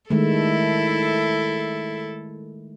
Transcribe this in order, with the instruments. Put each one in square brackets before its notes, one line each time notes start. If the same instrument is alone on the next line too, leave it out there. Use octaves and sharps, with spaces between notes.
[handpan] D#3 G#3 A3 [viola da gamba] E4 A4